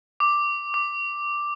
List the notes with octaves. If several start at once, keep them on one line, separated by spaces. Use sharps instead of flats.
D6
D6